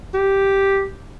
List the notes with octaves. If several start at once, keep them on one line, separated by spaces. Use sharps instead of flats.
G4